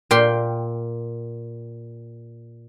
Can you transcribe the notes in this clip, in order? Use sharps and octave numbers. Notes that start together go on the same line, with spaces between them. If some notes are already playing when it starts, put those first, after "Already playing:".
A#2 G5 C6